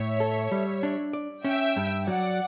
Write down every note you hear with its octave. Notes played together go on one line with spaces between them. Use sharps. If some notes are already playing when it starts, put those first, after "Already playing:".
Already playing: A2 C#5 E5
A4
G3
D4
D5
C#4 E5 G5
G2
F#3 D5 F#5